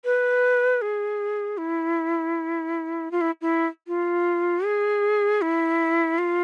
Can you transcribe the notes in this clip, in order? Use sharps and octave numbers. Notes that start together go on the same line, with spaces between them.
B4
G#4
E4
F4
E4
E4
F4
G#4
E4
F4